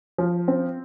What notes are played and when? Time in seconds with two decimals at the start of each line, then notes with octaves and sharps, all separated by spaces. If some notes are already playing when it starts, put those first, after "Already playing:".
0.18 F3
0.48 C4